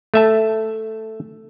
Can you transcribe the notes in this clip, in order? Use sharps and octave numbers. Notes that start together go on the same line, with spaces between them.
A3 E5 A5